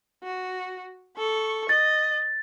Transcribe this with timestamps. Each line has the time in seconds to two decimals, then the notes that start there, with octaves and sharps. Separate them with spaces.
0.23 F#4
1.17 A4 C#6
1.69 D#5 A6